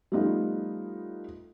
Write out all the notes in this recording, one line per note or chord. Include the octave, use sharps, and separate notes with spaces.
F3 G3 A3 B3 D#4 F4